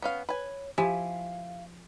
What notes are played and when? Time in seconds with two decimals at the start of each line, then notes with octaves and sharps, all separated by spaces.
0.02 B3 C#4 F5
0.29 B4 C#5 G#5
0.78 F3 E4 G4 F5 G#5